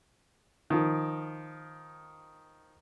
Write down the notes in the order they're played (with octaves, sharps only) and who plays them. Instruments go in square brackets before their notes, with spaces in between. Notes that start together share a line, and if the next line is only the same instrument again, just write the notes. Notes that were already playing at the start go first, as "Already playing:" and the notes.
[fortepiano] D#3 F3